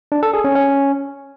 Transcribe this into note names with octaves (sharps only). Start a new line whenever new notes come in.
D4
A4
G#4
C#4
C#4